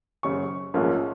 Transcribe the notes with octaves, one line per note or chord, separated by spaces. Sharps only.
F#1 F#2 C#3 C#6
A#1 G#2 F3 A#3 C#4